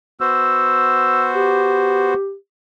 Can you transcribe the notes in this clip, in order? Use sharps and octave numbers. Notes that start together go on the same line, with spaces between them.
B3 F#4 C5 E6
G4